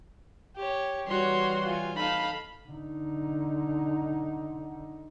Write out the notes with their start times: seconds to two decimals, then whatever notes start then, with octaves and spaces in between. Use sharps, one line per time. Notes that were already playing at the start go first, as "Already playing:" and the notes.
0.56 G4 C#5
1.07 E3 G3 F#4 C#5 C6
1.64 F4 G#5
1.96 D#4 A4 F5 B5
2.69 D3 D#4